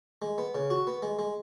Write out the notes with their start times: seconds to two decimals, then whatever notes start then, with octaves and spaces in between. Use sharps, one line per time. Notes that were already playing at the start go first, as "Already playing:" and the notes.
0.22 G#3
0.38 B3
0.55 C#3
0.70 F#4
0.87 B3
1.02 G#3
1.19 G#3